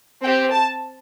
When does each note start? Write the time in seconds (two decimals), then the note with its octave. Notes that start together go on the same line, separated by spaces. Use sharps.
0.23 C4 G5
0.28 G4
0.52 A5